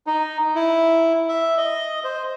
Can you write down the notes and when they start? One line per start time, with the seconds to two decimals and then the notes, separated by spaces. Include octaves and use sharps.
0.07 D#4
0.55 E4
1.29 E5
1.58 D#5
2.04 C5